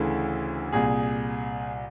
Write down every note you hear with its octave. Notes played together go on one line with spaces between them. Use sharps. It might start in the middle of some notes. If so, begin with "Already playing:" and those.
Already playing: D2 C#3 E3 A4
C2 A#2 G#4